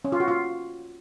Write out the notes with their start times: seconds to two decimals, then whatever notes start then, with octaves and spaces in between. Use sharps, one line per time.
0.05 C#4
0.12 F4
0.20 F#4
0.28 F4